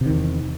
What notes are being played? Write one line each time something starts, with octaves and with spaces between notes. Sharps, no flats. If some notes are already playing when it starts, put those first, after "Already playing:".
E2 C3 D#3